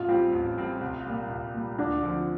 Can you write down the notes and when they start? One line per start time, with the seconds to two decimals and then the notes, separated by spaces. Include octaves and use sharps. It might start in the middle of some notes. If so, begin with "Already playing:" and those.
Already playing: A1 F4
0.08 A2 G3 C4 G4
0.33 A1
0.57 A2 G3 C4 G4
0.81 C2
1.05 A#2 G3
1.30 C2
1.54 A#2 G3
1.78 D2 D4
2.02 D3 F3 C4